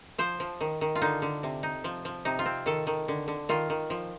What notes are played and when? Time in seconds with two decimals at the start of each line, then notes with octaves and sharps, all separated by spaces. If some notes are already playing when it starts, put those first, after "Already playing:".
0.18 F3 C5
0.40 F3
0.61 D#3
0.81 D#3
0.95 F4
1.01 D3 D#4
1.22 D3
1.43 C3
1.63 D#4
1.84 F3
2.05 F3
2.25 C3 D#4
2.39 F4
2.46 C4
2.66 D#3 A4
2.87 D#3
3.08 D3
3.28 D3
3.49 D#3 F4
3.70 D#3
3.90 F3